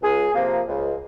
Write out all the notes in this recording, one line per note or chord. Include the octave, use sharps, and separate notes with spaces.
C#2 G#4
C3 F3 A#3
C#2